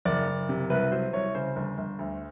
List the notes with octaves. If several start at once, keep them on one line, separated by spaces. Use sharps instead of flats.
F#1 D5
F#1
C3
C2 B4
F#3 C5
C2 C#5
C#3 C5
G1
G1
D2